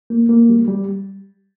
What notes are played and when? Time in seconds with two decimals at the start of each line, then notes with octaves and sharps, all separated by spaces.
0.10 A#3
0.29 A#3
0.49 G3
0.68 G3